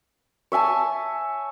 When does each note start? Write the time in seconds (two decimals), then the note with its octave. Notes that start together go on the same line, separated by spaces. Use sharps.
0.52 C#5 E5 G#5 A5